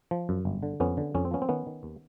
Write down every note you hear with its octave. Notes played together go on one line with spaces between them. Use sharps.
F3
F#2
G1
D3
F2 B3 C#4
D3
F2 C#4
C4
F3 B3 C#4
C4
D#3 B3 C#4
D#3
D#2